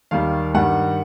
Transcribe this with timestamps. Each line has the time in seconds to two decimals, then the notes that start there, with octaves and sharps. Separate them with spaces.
0.11 D#2 D#3 G3 F5
0.54 G2 D#3 G3 F#5